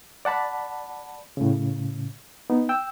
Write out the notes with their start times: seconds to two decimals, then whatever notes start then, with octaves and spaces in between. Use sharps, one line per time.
0.25 D5 F#5 A5 B5
1.37 A2 C#3
2.50 B3 D#4
2.69 G5 E6